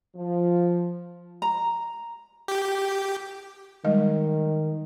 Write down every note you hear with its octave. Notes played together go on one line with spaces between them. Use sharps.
F3
A#5
G4
D#3 G3 G#3 D#5